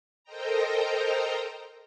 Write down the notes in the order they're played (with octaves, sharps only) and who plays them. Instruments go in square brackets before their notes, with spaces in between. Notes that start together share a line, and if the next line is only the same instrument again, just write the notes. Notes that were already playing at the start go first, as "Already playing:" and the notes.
[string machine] A4 A#4 C5 D#5 G5 A#5